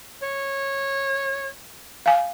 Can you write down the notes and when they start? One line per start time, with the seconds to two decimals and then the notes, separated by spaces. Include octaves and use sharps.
0.22 C#5
2.06 F5 G#5